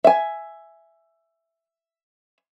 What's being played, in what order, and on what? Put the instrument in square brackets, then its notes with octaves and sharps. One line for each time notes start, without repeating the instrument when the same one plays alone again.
[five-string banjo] E5 G#5